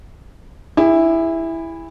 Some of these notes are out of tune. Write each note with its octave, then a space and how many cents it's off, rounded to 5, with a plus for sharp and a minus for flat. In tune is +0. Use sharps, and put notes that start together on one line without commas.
E4 +0 G#4 -35